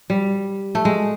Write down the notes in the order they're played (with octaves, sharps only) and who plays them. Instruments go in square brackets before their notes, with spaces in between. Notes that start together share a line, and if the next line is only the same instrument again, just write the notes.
[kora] G3
A3
G#3